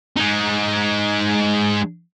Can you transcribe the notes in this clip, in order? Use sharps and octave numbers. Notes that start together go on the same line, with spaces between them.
G#3 D#4